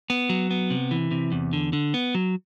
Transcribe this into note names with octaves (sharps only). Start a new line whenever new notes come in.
B3
F#3
B3
C3
E3
C3
E2
D3
D3
B3
F#3